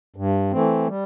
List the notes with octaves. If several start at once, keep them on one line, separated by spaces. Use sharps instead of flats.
G2
E3 A3 C4
G3